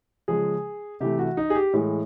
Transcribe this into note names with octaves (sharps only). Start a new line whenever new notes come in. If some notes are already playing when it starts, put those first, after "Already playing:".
C#3 F3 G#3 G#4
C3 E3 A3 G4
F#4
D#4
G#4
G4
A2 E3 G#3